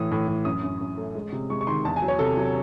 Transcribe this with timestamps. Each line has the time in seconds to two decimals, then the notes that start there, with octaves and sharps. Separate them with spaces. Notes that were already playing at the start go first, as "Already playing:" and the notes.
Already playing: A2 E3 D#6
0.11 A2
0.28 A2
0.45 F#2 D#6
0.63 F#2
0.81 F#2
0.97 A3
1.15 G#3
1.32 C3
1.50 G#3 C#6
1.61 C#6
1.67 D#3 C6
1.85 E2 A5
1.96 G#5
2.02 F#3
2.08 C#5
2.19 C3 A4
2.37 F#3